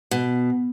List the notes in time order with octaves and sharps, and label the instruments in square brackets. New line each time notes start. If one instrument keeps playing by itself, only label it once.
[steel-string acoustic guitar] B2